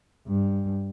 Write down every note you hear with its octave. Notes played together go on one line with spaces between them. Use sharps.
G2